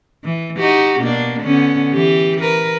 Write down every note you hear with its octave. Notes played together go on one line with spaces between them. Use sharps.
E3
D#4 F#4 G4
B2 A#3 D4
D3 B3 C#4
E3 G4
A#4 B4